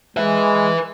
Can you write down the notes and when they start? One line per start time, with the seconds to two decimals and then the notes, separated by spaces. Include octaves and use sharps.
0.17 G#3 B4 E5